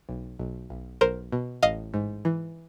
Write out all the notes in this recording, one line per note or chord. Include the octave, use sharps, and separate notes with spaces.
B1
B1
B1
B1 A#4 C5
B2
A1 D#5 F5
G#2
E3